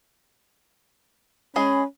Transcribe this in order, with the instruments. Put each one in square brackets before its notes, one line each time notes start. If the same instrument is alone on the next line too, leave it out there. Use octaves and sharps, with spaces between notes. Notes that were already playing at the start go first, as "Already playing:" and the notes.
[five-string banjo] G#3 G#4 [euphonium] C#4 [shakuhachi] B5